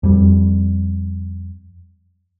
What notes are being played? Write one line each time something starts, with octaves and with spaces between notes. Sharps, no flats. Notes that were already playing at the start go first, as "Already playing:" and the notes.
F2 G3